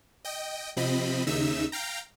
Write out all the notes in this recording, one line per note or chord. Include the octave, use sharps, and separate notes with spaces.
D#5 G5
C3 F3 C4 D#5 B5
D#2 C#3 D#4 E5 E6
F5 G5 A#5